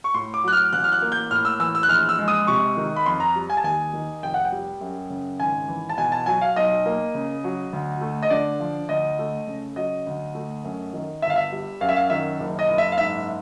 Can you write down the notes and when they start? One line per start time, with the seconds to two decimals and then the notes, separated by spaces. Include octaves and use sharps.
0.04 C#6
0.14 A2 C6
0.34 D6
0.44 F#3 F#6
0.53 F6
0.73 A1 F#6
0.84 F6
0.92 F#6
1.02 A#3
1.12 G6
1.31 A2 F6
1.45 E6
1.59 E3 E6
1.75 E6
1.83 F#6
1.89 A#1 F6
2.09 E6
2.18 G#3
2.28 D#6
2.47 C3 C#6
2.77 D#3
2.96 B5
3.06 F2 C6
3.20 A#5
3.36 G3
3.50 G#5
3.57 A5
3.64 D#2 G#5
3.93 D#3
4.23 F1 G5
4.34 F#5
4.45 G5
4.52 G3
4.81 F#2
5.10 C#3
5.40 G#1 G#5
5.68 E3
5.89 A5
5.97 B2 G#5
6.12 A5
6.26 F#3 G#5
6.41 F5
6.56 B1 D#5
6.86 A#3
7.15 C#3
7.44 F#3
7.73 D2
8.01 A3
8.23 D#5
8.30 D3 D5
8.60 F3
8.89 D2 D#5
9.19 A3
9.47 C#3
9.76 F#3 D#5
10.07 D2
10.35 A3
10.64 F#2
10.93 D#3
11.22 G1 E5
11.30 F5
11.36 E5
11.52 G3
11.81 F#2 F5
11.89 E5
11.96 F5
12.10 D#3 E5
12.40 F#1
12.59 D#5
12.69 F#1
12.78 E5
12.92 F5
12.98 G#2 E5